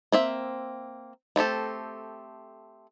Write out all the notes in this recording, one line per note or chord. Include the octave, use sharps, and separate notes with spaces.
A#3 C4 E5
A3 C4 G4 A4